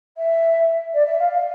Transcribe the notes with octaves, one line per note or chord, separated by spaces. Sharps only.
E5
D5
E5
F5
F5